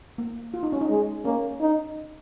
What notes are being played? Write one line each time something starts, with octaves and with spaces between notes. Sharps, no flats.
A#3
F4
D#4
C#4
D#4
G#3
A#3 C#4
D#4